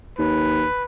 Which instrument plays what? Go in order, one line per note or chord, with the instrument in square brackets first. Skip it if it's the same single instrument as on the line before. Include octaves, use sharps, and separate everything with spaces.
[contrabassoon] D#2 [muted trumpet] B4